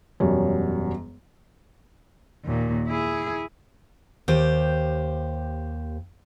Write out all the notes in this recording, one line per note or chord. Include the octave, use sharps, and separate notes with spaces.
E1 F#2 F#3 G3 C#5
D#2 A#2
E4 G#4
D#2 G4 C5